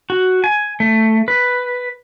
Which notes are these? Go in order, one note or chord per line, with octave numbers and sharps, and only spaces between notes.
F#4
G#5
A3
B4